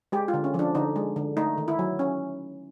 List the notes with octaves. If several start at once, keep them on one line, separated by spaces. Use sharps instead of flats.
G#3 G4
F4
D3
C#4
F3 D4
D3 D#4
G#3
D3
A3 D#4
D#3
E4
F#3
C#4